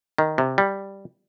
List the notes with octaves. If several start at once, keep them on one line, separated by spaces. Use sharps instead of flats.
D#3
C3
G3